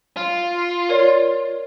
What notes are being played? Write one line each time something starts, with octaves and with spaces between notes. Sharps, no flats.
F4
A#4 C#5 D5